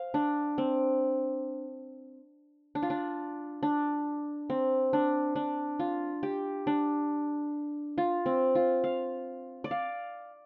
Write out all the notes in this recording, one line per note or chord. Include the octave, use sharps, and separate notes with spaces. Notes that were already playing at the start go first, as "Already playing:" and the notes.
Already playing: C5 F5
D4
C4
D4
F4
D4
D4
C4
D4
D4
F4
G4
D4
F4
C4
F4
F5
D5
F5